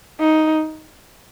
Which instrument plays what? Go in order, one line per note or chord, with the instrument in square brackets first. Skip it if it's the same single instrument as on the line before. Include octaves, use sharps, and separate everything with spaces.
[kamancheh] D#4